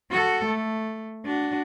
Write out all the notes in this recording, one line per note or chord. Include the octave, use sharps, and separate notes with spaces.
F#4 A4
A3
D4 F#4